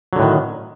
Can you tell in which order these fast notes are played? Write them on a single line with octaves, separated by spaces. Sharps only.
F#3 D3 A2 D#3